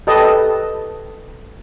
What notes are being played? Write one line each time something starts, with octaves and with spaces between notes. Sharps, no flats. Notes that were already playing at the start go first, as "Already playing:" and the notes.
G4 A4 B4 D#5 A5